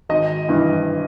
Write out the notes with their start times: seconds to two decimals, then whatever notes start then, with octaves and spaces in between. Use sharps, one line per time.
0.09 G#1 D#5
0.49 G2 E3